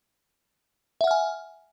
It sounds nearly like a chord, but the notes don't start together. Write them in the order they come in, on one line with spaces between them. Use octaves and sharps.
E5 F#5 F6 G#5